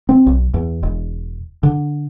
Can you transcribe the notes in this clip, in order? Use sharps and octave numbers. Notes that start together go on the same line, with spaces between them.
C4
B1
E2
E1
D3